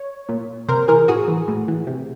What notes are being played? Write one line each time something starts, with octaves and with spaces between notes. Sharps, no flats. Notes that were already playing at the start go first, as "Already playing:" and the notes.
Already playing: C#5
A#2
C3 A#4 C5
E3 G#4 A#4
A2 F#4 G#4
E3
A2
E3
C3